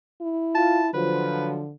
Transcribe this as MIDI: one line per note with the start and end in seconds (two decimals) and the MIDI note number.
0.21 0.92 64
0.55 0.81 65
0.55 0.88 81
0.94 1.73 50
0.94 1.61 53
0.94 1.61 54
0.94 1.51 71